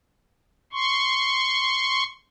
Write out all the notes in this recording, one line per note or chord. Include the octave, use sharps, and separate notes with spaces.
C6 C#6